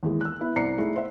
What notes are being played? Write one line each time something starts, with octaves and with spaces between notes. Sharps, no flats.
D#2 E3 G#3
E6 F#6
B3 E4
C2 C5 D5 A#5 C7 C#7
A3 D#4 E4 G#4
C5 E5